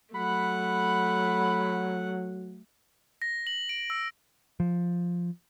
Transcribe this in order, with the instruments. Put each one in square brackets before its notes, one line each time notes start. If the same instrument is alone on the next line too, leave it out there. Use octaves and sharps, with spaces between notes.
[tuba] F#3 [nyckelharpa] A3 F#5 [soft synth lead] B5
[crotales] A#6
F#7
D7
E6
[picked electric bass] F3